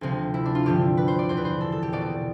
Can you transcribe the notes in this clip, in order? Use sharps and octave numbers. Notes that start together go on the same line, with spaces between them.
D2 C3 F3 C4
E4
D4
F4
G2 D3 F3 G4
B4
C5
D5
E2 B2 C5
B4
C5
A4
A4
G4
C2 B2 D5